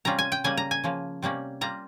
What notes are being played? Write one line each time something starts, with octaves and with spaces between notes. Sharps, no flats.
C3 G3 C#4 F4 A#5
G#5
G5
C#3 G3 A#3 G#5
A#5
G#5
C#3 F3 A#3
C3 G3 A#3 C#4
G3 A#3 F4 A#5